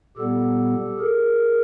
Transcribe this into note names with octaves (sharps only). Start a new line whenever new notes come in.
A#2 G3 B3 G4 A4
G#4 A#4